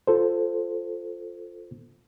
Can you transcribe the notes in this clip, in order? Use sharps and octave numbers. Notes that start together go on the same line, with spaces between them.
F4 A4 C5